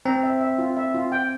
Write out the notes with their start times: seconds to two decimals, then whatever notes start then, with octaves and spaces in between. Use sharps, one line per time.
0.05 C4 A#5
0.23 E5
0.41 E5
0.58 F4
0.77 E5
0.94 F4
1.12 G5